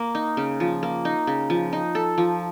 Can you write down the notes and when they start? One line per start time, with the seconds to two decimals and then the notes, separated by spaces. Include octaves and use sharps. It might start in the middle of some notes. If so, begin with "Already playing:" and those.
Already playing: A#3
0.15 D#4
0.37 C#3
0.60 F3
0.83 A#3
1.05 D#4
1.27 C#3
1.50 F3
1.73 D#4
1.95 A4
2.18 F3